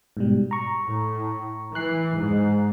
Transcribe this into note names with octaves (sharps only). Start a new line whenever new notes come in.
G#2 B2 G3
A#5 C#6
A2
E3 F#6 C7
G#2